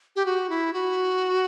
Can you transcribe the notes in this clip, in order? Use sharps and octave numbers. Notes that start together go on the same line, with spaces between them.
G4
F#4
E4
F#4